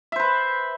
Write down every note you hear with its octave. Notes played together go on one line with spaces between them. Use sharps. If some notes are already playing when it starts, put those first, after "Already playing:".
B4 C5 E5